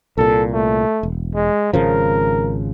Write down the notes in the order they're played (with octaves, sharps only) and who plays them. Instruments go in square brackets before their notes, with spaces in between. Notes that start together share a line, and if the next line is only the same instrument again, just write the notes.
[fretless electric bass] C2 A#2 [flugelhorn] A4
[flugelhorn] A3
[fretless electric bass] E1
[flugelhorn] G#3
[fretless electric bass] G#1 C#3 F3 [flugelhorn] A#4